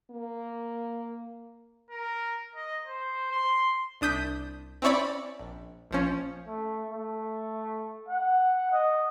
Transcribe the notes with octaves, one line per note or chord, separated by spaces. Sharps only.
A#3
A#4
D#5
C5
C6
C2 D4 D#6 G6 B6
C4 C#4 E4 C#5 D5 B5
A#1
A#1 F3 C#4
A3
A3
F#5
D#5